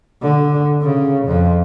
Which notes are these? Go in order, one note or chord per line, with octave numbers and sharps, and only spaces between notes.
D3
C#3
F2